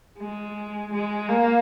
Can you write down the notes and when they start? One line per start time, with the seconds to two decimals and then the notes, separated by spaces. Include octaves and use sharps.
0.18 G#3
0.93 G#3
1.30 A#3